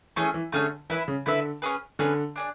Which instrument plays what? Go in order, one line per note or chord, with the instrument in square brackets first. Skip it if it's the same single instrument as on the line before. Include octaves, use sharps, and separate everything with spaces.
[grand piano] E3 [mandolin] A3 C#4 G#4
[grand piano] E3
[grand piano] D3 [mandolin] A3 C#4 G#4
[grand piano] E3 [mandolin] E4 B4 E5
[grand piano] C#3
[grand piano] D3 [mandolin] E4 B4 E5
[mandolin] C#4 G#4 B4
[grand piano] D3 [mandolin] C#4 G#4 B4
[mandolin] D4 G#4 D5